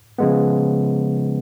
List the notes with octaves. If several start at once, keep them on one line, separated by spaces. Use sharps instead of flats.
C#3 F3 G#3 B3